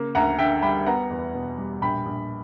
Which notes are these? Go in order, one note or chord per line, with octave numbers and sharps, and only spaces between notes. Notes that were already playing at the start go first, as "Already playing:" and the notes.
Already playing: C#3 A#3
D2 F#5 A#5
D3 E5 G5
G3 G5 B5
B3 F#5 A#5
E2
B2
G3
A#1 G5 B5
A#1